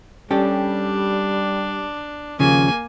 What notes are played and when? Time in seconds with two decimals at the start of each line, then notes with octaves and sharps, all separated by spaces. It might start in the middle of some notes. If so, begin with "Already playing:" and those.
0.31 G3 C#4 D4 G4 A4
2.39 D#2 C#3 F3 A#3 G#5